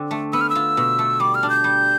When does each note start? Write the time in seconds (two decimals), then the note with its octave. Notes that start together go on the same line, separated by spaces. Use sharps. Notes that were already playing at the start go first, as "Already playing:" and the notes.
Already playing: D3 C4
0.11 A3
0.33 B3 E6
0.41 F6
0.50 E6
0.55 F4
0.77 B2
0.99 A3
1.20 G3 D6
1.35 F6
1.43 D4
1.50 G6
1.64 G3